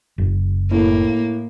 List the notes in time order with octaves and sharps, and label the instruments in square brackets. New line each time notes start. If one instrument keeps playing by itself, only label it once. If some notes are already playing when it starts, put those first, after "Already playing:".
[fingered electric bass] F#1
[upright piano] A2 [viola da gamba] A#3